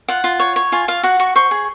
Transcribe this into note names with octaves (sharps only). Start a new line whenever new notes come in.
F4 F#5
F4
C#5
C#5
F4 G#5
F4 F5
F#4 F#5
F#4 C#6
C5 C#6
G#4